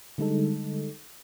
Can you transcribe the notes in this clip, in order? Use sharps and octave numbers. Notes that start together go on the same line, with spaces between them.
D3 G3 G#3 D#4 A4